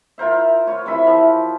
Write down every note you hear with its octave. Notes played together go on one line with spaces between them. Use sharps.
F4 A#4 C5 E5
F4 C#5
C3 E3 E5 B5
F3